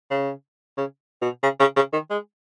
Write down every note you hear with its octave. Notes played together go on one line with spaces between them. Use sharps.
C#3
C#3
B2
C#3
C#3
C#3
D#3
G#3